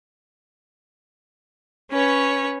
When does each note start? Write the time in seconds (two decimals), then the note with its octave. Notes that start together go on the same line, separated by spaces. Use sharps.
1.91 C#4 B4 C#5